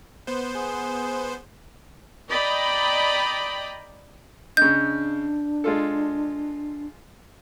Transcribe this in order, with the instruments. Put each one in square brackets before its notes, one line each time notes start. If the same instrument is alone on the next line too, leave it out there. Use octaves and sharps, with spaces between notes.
[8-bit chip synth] B3 C5
[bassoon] G#4
[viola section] D5 D#5 G5 A#5 B5
[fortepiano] C#3 D#5 [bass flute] D4 [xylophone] G6
[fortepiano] G#3 F4 A4